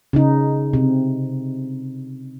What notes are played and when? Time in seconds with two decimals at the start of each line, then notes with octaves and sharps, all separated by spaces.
0.13 C#3 D#4
0.73 C3